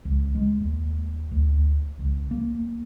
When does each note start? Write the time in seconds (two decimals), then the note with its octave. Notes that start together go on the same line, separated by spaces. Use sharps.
0.05 C#2
0.35 G#3
0.60 D#2
1.32 D2
1.99 C#2
2.31 A#3